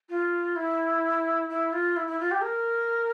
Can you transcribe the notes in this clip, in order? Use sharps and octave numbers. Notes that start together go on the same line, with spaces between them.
F4
E4
E4
F4
E4
E4
F4
G4
A#4